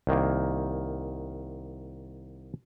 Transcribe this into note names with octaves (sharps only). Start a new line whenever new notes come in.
C2 D#3 A#3